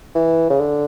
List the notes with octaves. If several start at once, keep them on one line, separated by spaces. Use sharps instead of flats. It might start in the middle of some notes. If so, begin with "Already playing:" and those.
E3
C#3
D3